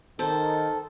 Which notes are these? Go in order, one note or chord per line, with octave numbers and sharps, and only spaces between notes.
D#3 A4 C5